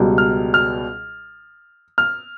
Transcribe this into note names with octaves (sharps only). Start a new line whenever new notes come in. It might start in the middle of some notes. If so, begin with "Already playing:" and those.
Already playing: C#2 B2 G3
F6
F6
F6